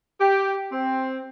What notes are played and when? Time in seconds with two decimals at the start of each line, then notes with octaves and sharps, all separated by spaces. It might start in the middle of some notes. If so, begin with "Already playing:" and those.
0.20 G4
0.71 C4